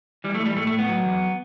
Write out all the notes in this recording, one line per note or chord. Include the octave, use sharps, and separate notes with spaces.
E3 G3
A3
E3
G3
A2 A3
A3
A2
B3
F#3
E2